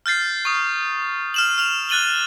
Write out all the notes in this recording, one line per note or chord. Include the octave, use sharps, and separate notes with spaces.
F6 G6 A6 C7
C#6 D#6
F6 E7 F#7
F6 F7 F#7
F#6 A6 D#7 F#7 G7